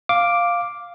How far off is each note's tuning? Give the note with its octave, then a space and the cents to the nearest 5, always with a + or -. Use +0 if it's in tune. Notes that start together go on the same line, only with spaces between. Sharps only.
F5 +0 D6 +0